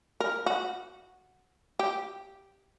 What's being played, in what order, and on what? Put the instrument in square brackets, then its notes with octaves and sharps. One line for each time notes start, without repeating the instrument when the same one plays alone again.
[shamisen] A#4
F#4
G4